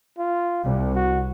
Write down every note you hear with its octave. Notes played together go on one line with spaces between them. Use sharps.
F4
C2 G3
F#4